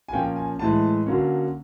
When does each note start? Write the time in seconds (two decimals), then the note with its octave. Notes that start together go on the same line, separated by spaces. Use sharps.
0.08 G#5
0.13 A#2 F3 A#3 C#4 G5
0.36 G#5
0.59 A2 E3 G#3 A5
1.06 D3 F#3 A#3 C#4